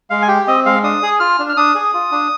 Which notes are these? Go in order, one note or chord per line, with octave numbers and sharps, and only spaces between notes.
G#3 F5
G#5
G4 G5
C4 D#5
G#3 F5
D4 D#6
G#4
F4 F6
D4
F6
D4 D#6
G#4
F4
D4